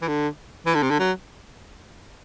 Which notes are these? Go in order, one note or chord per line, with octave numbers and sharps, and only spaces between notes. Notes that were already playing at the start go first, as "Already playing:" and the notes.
E3
D3
E3
D3
C3
D3
F#3